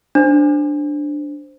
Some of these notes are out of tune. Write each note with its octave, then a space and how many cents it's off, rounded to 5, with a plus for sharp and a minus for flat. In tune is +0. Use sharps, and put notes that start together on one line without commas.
D4 +0 C5 +0